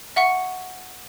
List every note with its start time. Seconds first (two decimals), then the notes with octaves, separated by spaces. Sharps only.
0.16 E5 F#5 C#6 C#7